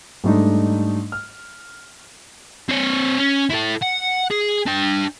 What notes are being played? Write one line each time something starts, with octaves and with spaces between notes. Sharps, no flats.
G#2 G3 A3 D4 D#4
F6
C4 C#5
C#4
E4 A4
F#5
G#4
D4 G5